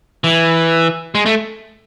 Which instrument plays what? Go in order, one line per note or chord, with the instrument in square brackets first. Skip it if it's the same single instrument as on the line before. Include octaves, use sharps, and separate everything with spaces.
[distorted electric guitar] E3
G#3
A3